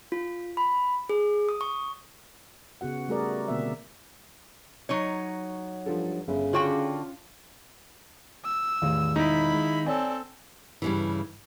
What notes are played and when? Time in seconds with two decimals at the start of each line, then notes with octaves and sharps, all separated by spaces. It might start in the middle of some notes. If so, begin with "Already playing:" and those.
0.12 F4
0.57 B5
1.09 G#4
1.49 D#6
1.61 C#6
2.81 C#3 B3 F#4 F#5
3.08 G3 A3 F#4 G#4 A#4 D5
3.48 B2 D3 A#3 C4 E5
4.89 F#3 D#4 C#5
5.86 G2 F3 A4
6.28 G1 C#3 E5
6.53 D3 C#4 F4 F#4 F5 G5
8.45 E6
8.82 A1 E2 D#3 F5
9.16 E1 D#4 E4 B5 D7
9.53 G#3
9.86 C4 A4 C#5 D5 G#5
10.82 G2 C#3 E3